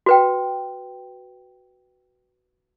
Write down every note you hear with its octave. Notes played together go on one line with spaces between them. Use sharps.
F#4 B4 G5